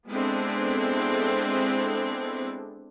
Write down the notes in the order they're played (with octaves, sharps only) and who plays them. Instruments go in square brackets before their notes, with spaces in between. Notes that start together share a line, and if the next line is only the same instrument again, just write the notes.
[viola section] G#3 B3 C4 D4 E4 A4